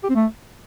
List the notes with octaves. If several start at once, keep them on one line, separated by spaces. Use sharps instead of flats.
G4
C4
A3